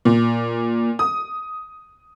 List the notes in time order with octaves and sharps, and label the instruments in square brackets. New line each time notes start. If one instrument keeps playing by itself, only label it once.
[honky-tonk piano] A#2
D#6